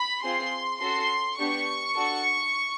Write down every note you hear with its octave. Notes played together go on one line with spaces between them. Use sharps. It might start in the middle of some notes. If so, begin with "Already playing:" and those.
Already playing: B5
C4 F4 G#4 C6
C#4 F#4 A4 C6
B3 D4 G4 C#6
D4 F#4 A4